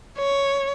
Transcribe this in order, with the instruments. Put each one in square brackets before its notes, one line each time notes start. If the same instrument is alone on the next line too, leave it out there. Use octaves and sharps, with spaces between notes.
[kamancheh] C#5